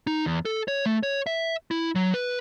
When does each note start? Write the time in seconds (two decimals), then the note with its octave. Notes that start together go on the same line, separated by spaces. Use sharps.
0.07 D#4
0.26 E2
0.45 A4
0.68 C#5
0.86 A3
1.03 C#5
1.27 E5
1.71 E4
1.95 F#3
2.14 B4